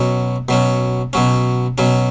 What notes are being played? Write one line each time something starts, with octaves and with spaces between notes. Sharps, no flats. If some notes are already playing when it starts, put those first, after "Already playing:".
Already playing: B2 F#3 C#4
B2 F#3 C#4
B2 F#3 C#4
B2 F#3 C#4